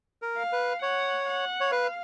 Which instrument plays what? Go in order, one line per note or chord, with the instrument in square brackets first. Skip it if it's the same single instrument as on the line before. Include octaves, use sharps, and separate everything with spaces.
[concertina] A#4
[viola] F5
[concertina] B4
[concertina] C#5 [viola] F#5
[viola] F#5
[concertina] C#5
[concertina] B4 [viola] F5